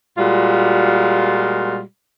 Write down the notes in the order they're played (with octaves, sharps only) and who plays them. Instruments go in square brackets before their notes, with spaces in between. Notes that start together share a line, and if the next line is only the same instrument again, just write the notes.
[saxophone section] A#2 G3 G#3 F4 F#4